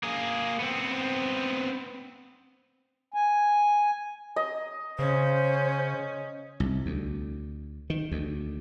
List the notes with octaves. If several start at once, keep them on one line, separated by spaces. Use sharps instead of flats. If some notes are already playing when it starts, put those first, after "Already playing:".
A#3 G#4
B3 C4
G#5
D#5
C#3 C#4 C5
C2
D2
D#3
D2